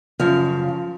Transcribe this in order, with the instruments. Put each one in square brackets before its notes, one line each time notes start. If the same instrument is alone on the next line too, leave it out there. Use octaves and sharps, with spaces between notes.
[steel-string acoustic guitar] F#2 C#3 F3 F5